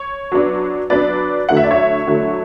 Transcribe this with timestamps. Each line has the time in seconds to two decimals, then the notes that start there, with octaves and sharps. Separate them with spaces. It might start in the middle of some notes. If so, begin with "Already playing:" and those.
Already playing: C#5
0.32 F#3 B3 D4
0.90 F#3 B3 D4 B4 D5
1.49 D3 F#3 A3 E4 F#5
1.57 E5
1.64 D5
1.71 C#5 E5
2.07 D3 F#3 A3 E4